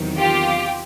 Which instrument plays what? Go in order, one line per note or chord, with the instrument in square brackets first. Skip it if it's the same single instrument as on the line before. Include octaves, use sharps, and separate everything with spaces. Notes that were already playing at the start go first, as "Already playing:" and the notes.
Already playing: [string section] E2 C3 D#3 F#3
F4 G4